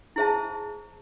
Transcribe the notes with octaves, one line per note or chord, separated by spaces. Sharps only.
E4 G#4 C5 E5 A5